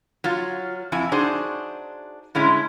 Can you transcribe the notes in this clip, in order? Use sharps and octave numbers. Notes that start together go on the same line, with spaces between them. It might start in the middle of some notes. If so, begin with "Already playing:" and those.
F#3 F4
F2 E4 G#5
D4 D#4 F#4 G#4 C5
A2 D3 G#3 C#4 E4